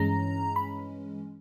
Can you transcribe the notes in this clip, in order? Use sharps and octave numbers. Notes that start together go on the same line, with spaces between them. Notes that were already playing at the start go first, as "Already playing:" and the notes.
Already playing: G2 E3 G#3 C#4 A#5
B5